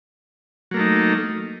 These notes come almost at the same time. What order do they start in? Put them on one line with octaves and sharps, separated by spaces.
F#3 A#3 A3 D#4